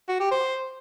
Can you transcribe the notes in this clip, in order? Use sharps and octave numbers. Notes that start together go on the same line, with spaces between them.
F#4
G4
C5